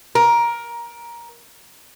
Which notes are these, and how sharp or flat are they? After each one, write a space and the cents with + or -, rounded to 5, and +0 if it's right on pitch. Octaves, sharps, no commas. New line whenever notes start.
A#4 +15